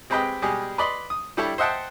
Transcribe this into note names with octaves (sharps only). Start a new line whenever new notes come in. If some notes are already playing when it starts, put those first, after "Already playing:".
G#3 C4 G4 B4 D#5 G5
B2 G3 G#3 G4 G#4
B4 D5 D#5 B5 C6
D#6
G3 D4 E4 G4 A4 C#5
C5 D#5 E5 F#5 G5 A5